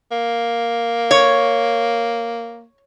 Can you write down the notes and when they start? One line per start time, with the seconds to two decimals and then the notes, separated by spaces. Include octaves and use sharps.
0.11 A#3
1.11 C#5